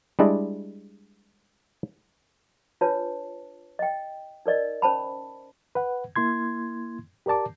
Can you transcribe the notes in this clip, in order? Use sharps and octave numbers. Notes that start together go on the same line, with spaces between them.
G3 G#3 D4 E4 D5 D#5
D4 F4 B4 C#5 A5
D#5 G5
D#4 A#4 D5 D#5
C#4 C5 A5 B5
B4 F#5
A#3 E4 C6 G#6
G4 A#4 D5 A5 D6